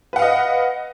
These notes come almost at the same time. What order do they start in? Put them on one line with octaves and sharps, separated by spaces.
B4 F#5 F5 D#5